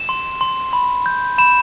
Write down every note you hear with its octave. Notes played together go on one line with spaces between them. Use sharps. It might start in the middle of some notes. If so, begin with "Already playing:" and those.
Already playing: E7
C6
C6
B5
G6
B5 E7